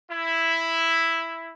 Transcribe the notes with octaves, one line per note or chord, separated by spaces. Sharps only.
E4